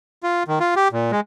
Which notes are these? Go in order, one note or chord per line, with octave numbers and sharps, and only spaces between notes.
F4
D#3
F4
G4
A#2
G#3